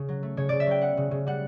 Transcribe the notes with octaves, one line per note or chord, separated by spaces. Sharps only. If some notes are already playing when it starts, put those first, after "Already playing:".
Already playing: C#3
F#3
A3
C#3 C#5
C#3 D5
E5
F#3 G5
B3 F#5
C#3
C#3
G3 F#5